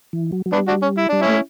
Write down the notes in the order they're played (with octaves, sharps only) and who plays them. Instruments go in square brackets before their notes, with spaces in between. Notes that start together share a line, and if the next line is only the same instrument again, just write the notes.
[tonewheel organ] E3
F#3
F#3
[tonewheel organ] G3 [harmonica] B3 D4
[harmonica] D4 F#4
C#4
E4
[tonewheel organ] G3 [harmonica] D4
[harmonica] C#4 E4
[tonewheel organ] A3